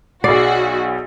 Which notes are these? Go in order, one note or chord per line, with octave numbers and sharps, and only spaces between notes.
B1 F#4 G#4 D5 C7